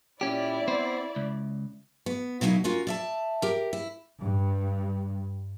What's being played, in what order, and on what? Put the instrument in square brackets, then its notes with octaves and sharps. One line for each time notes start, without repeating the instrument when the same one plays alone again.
[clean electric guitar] A#2 C#4 G4 [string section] E4 D5
[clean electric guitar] B3 C4 C5
C#2
[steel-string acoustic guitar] B3
B2 F#3 A#3 D#4 E4
C#4 F4 F#4 A#4
D5 E5 A5
G4 A#4
E4
[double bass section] G2